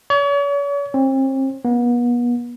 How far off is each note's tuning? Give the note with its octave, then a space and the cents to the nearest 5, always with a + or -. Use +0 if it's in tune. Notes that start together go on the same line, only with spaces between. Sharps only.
C#5 +40
C4 +35
B3 -40